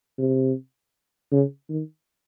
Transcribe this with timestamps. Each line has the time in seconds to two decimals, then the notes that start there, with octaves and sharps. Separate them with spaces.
0.19 C3
1.32 C#3
1.70 D#3